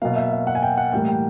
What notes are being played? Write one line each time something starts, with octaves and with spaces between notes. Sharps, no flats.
B2 F#3 A#3 F5
E5
F5
F#5
G#5
G5
F#5
A2 E3 G3 A#3 G5
G5